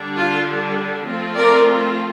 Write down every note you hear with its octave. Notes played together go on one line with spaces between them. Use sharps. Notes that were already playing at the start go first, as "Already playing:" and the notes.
Already playing: D3 G3 D4
F4
F3 A3 C4 F4
A#4 D5